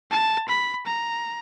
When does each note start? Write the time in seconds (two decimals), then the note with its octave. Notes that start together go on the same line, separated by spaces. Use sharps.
0.11 A5
0.48 B5
0.86 A#5